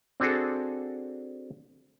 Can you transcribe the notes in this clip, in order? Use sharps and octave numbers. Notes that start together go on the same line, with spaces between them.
C4 D4 F#4 G#4 A4